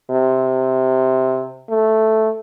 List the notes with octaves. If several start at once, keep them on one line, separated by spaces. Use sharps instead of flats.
C3
A3